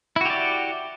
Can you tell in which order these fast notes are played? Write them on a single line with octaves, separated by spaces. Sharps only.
E4 F#4 G4 D5